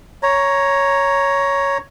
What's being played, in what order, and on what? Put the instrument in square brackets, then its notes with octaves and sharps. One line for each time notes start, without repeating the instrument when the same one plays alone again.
[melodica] C#5 A#5